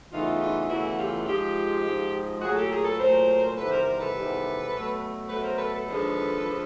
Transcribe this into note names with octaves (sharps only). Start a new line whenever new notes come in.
E2 C#3 E3 A3 D#4 F4
D#4 F4
F4
E2 C#3 E3 A3 E4 F#4
F4 G4
G#2 F3 G#3 F4 G4
G#2 F3 G#3
A#2 F#3 A3 F#4 G#4
G4 A4
G#4 A#4
A4 B4
A#2 F#3 A3 A#4 C5
E2 C3 D#3 G3 A4 B4
A#4 C5
A#4 C5
A4 B4
E2 C3 D#3 G3
B2 F#3 A3
B2 F#3 A3 A4 B4
A#4 C5
A4 B4
A4 B4
D#2 D3 F3 G#3
D3 F3 G#3